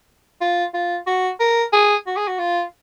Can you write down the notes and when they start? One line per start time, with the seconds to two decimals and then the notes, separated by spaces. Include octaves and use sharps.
0.41 F4
0.74 F4
1.07 F#4
1.40 A#4
1.73 G#4
2.07 F#4
2.17 G#4
2.28 F#4
2.39 F4